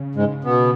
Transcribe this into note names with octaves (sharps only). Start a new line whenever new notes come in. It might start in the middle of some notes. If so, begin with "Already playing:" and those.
Already playing: C#3
G#2 G#3
B2 B3